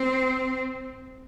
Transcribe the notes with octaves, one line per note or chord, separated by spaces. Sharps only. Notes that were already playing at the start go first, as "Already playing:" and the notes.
Already playing: C4